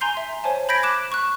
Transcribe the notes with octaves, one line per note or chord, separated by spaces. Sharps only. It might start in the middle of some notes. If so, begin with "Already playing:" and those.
G#5 A#5 C6 G6 C7
E5
C5 C#5 G#5 A5
B5 G6 G#6 A#6 B6 D7
D6 F#6 E7
C#6 F#6